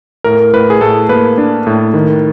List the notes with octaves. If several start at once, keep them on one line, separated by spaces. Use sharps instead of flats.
A2 A#4
A2 B4
G#4
A2 A4
A#3 B4
D4
A2
D#3